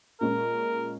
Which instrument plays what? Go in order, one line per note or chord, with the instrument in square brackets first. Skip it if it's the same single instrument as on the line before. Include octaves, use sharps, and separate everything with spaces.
[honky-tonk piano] A#2 G#3 C#4 [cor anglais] A#4